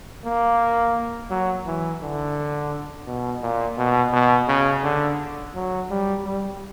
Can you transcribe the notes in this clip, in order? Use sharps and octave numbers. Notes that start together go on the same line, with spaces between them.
A#3
F#3
E3
D3
B2
A#2
B2
B2
C#3
D3
F#3
G3
G3